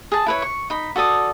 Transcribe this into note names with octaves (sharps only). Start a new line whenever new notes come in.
G#4 A5
E4 B4 C#5
C#6
D#4 B5
F#4 A4 D5 D#6